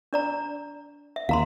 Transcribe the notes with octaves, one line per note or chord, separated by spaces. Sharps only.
D4 D5 A#5
E5
D#2 F5 A#5 C6